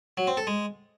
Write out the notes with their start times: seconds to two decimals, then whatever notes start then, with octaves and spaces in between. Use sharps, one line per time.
0.17 F#3
0.27 C4
0.37 A4
0.47 G#3